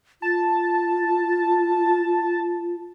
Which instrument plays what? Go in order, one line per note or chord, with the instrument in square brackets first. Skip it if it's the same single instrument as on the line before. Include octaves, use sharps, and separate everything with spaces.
[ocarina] F4 [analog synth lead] A5